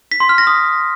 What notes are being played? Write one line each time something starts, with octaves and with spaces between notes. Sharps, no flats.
B6
C6
F6
A#6
D#6